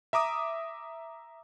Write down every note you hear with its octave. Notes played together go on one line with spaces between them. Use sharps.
E5 A#5 D6 D#6